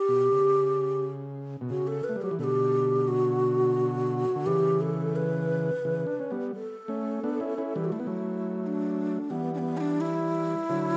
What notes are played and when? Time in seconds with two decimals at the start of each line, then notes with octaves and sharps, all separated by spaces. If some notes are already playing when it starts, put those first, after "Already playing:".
Already playing: G4
0.08 B2
0.32 C#3
1.61 B2
1.70 C#3 F#4
1.87 A4
2.04 B4
2.09 A3
2.16 G3
2.21 F#3 G4
2.31 E3
2.39 B2 D3 G4 A4
3.08 F#4
4.36 D3
4.46 C#3 E3 G4
4.81 A4
5.16 B4
5.85 C#3 E3
6.07 D4
6.19 C#4
6.31 G3 B3
6.55 A4
6.88 A3 C#4
7.23 B3 D4
7.40 C#4 E4
7.58 C#4 E4
7.76 E3 G3
7.84 F#4
7.92 A3 E4
8.00 B3
8.07 F#3 A3
8.62 E4
8.67 D4
9.30 E3 G3 B3
9.54 D4
9.58 B3
9.77 E4
9.80 D4
10.01 E4
10.69 D3 F#3